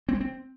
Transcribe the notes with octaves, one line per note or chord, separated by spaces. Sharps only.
C4
G#3
C4